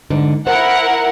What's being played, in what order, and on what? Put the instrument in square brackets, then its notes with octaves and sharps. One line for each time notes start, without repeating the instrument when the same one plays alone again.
[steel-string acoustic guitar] G#2 D3
[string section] E4 A#4 F#5 [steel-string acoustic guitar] C5